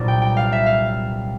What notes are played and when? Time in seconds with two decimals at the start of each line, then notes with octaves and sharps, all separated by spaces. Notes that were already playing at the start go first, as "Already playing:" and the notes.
Already playing: C2 A#2 F#3 B3 D4 D5
0.08 G5
0.22 G5
0.37 F5
0.52 E5
0.66 F5